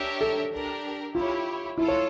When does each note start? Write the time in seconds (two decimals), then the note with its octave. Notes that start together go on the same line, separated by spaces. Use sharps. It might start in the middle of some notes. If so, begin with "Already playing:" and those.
Already playing: D4 G4 A#4 C#5 E5
0.21 A4
0.52 D4 G4 A#4
1.15 E4 F4 G4 C#5
1.78 E4 F4 A4
1.88 C#5